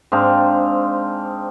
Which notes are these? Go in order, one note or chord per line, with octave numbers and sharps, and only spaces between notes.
G#2 C4 D4 F5